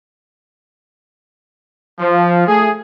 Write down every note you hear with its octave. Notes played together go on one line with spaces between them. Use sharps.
F3
A3 G#4